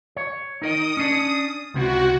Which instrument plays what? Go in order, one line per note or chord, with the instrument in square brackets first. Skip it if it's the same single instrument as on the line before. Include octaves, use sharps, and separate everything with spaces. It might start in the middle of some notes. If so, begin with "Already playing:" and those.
[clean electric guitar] C#5
[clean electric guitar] D#4 A#4 D#5 [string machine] D#6
[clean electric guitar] C#4 D4
[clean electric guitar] C#2 C3 E4 [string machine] F#4